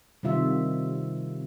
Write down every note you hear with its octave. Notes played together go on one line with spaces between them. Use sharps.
C3 D#3 G3 F4 E5